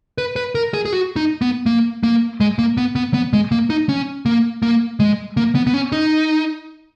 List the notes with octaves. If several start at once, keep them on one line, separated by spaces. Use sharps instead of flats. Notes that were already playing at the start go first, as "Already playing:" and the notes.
B4
B4
A#4
G#4
G#4
F#4
D#4
B3
A#3
A#3
G#3
A#3
B3
B3
B3
G#3
A#3
D#4
C#4
A#3
A#3
G#3
A#3
B3
B3
C#4
D#4